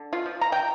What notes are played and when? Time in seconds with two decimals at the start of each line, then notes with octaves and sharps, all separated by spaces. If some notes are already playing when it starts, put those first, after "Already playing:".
Already playing: D3
0.13 F4
0.26 F3
0.41 A#5
0.52 G5